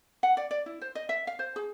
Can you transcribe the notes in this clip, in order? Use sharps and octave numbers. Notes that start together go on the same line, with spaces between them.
F#5
D5
D5
E4
C5
D#5
E5
F5
C5
G#4